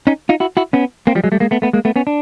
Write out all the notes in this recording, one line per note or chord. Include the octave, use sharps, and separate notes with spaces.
C#4 D#4
D#4 F4
E4 F#4
E4 F#4
B3 C#4
A#3 C4
F3 G3
F#3 G#3
G3 A3
G#3 A#3
A3 B3
A3 B3
G#3 A#3
A3 B3
B3 C#4
D4